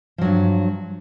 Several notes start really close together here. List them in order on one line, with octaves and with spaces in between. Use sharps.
F3 F#3 G2